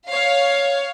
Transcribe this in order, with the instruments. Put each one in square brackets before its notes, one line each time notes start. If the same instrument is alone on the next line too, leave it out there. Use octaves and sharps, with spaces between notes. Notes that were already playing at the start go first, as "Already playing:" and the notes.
[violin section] C#5 F5